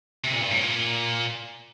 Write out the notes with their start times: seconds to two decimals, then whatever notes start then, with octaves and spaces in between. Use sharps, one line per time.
0.24 C3
0.33 A#2
0.41 G2
0.51 A2
0.60 A#2